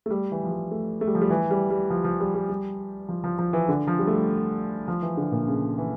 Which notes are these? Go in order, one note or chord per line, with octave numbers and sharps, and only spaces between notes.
A3
G3
E3
F3
G3
A3
A3
G3
F3
G3
E3
G3
G3
F3
F3
G3
G3
G3
F3
F3
F3
E3
D3
F3
G3
A3
G3
F3
E3
D3
A#2
C#3
E3